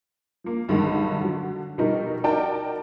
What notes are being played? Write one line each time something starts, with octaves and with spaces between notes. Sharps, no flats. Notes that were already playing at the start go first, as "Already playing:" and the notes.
F3 A#3
B1 G2 D3 D#3 G#3
D3 F#3
B2 F3 G3 D#4 A#4
D#4 F#4 A#4 D5 G5 A5